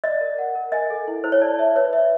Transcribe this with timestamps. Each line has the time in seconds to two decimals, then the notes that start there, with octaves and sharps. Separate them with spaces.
0.04 D5 D#5
0.21 A#4
0.39 F#5
0.55 A#4
0.72 D#5 G#5
0.90 A4
1.08 E4
1.24 E4 C5
1.32 C#5
1.41 D5 A5
1.59 E5
1.76 B4 C#5
1.93 E5